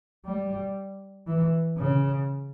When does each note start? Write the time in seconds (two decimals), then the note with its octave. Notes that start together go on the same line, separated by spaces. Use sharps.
0.25 G3
1.27 E3
1.78 C#3